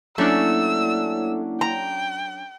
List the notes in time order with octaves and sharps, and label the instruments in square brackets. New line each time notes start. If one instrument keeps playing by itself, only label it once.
[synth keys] F#3 C#4 D4 [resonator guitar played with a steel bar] A3 [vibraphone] A#3 E4 F#5 [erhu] E6
[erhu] G5 [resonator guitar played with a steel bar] A#5